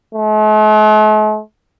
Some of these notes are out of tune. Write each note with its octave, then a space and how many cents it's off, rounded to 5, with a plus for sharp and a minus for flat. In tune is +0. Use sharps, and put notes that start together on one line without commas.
A3 -45